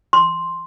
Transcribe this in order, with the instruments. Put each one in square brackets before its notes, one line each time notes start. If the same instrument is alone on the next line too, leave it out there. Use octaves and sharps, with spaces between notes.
[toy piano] C6